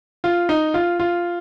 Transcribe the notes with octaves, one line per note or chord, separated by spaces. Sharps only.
F4
D#4
F4
F4